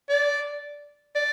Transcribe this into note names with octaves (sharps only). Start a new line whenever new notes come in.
D5
D5